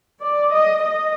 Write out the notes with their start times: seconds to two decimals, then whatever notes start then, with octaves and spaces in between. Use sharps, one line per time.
0.23 D5
0.54 D#5
0.83 D#5